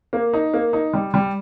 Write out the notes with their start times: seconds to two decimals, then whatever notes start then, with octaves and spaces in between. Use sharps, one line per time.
0.13 A#3
0.33 D#4
0.54 A#3
0.73 D#4
0.93 G3
1.14 G3